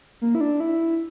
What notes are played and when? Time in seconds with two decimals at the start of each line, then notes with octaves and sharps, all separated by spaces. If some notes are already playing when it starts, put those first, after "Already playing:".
0.22 A#3
0.35 E4
0.41 D4
0.60 E4